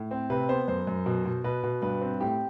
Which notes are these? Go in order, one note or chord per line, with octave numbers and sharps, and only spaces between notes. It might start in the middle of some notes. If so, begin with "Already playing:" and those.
Already playing: A2
C4
C3 B4
B3 C5
F#2 C5
F#2
B2
B2
B2 B4
B2
G2 B4
C4
A2 G4